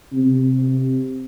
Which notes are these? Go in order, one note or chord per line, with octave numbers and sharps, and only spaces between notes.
C3